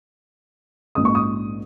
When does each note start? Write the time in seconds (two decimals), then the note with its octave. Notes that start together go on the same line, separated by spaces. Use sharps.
0.95 A#1 G#2 G#3 C#4 D#6
1.05 C#6
1.15 D#6